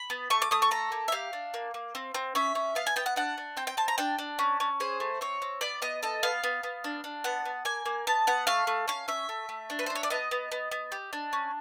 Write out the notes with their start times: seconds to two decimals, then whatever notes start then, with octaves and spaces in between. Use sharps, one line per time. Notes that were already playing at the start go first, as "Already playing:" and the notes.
Already playing: B5
0.10 B3
0.30 A3 C#6
0.42 D6
0.51 A3 D#6
0.62 C#6
0.71 A4 A#5
0.92 A#3
1.08 E5
1.12 G4 F5
1.33 D4
1.54 A#3
1.74 A#3
1.95 C4
2.15 C4
2.35 C#4 E5
2.55 C#4
2.75 B3 F5
2.87 G#5
2.96 B3 G5
3.06 F#5
3.16 D4 F#5
3.38 D4
3.57 C4 G5
3.67 G5
3.77 C4 A5
3.88 A#5
3.98 D4 G5
4.18 D4
4.39 C#4
4.60 C#4
4.80 G#4 C5
5.00 A3
5.21 C4 C#5
5.42 C4
5.61 B3 D5
5.82 B3 D#5
6.03 A4 D#5
6.23 B3 F5
6.44 B3
6.63 B3
6.84 D4
7.04 D4
7.24 B3 F#5
7.45 B3
7.65 A#3 G#5
7.86 A#3
8.07 B3 A5
8.27 B3 F#5
8.47 A3 F5
8.67 A3
8.88 C#4 F5
9.08 C#4 E5
9.29 A3
9.49 A3
9.70 D4
9.79 B4
9.86 C5
9.90 D4
9.95 C#5
10.03 D5
10.10 B3 D#5
10.31 B3
10.52 B3
10.71 B3
10.92 G4
11.13 D4
11.33 C#4